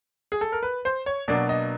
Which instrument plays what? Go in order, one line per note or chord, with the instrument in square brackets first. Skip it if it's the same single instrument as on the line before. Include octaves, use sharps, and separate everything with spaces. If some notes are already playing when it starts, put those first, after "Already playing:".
[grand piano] G#4
A4
A#4
B4
C5
C#5
B2 F#3 A#3 D4 D5
D#5